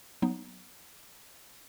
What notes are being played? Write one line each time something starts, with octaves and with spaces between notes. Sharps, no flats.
F#3 B3 D#4